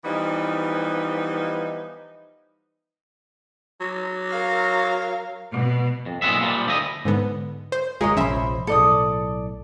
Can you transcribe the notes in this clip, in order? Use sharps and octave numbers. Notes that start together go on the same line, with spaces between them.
E3 F3 G3 B3 D#4
F#3
A#4 F5
B2
F2
B1 A#2 F#3 G#3 B3 E5
A#2 F3 G3
D2 E4 D#5
G#2 D3 B3
C5
F#1 D2 G#3 F4 A#4 C#5 D#5
F1 A#1 F3 C#4 C5 E5 B5
B1 A2 A4 D5 D#6